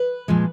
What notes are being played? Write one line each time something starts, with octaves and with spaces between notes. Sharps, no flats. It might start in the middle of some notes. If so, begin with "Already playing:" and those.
Already playing: B4
A#2 F3 G#3